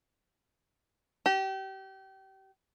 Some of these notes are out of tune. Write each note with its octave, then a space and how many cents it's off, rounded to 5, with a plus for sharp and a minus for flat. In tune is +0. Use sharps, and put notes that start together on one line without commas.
G4 -30